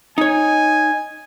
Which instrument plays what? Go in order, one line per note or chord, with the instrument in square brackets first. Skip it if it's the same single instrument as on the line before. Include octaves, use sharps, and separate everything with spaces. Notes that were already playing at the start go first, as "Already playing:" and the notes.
[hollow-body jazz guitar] D#4 C#5 [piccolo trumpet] G#5